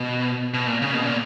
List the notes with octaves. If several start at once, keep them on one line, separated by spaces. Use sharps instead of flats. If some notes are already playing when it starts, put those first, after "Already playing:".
Already playing: B2
B2
A#2
C#3
B2
A#2